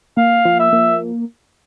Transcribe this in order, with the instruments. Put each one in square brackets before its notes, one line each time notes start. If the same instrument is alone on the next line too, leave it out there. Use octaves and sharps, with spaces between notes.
[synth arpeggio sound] A#3 [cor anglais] F5
[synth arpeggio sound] F3
[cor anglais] E5
[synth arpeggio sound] A#3